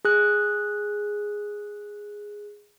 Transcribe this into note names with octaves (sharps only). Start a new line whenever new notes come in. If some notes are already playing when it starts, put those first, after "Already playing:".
G#4 F#6